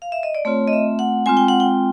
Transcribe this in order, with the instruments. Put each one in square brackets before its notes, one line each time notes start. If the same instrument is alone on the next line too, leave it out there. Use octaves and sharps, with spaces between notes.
[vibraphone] F5
E5
D#5
D5
A3 C4 F4 C#5
D#5
E5
F#5
G#3 C4 F4 G#5
G5
F#5
G5